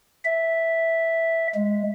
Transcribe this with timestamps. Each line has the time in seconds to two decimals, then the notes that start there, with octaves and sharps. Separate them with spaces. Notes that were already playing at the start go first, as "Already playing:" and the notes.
0.25 E5
1.54 G#3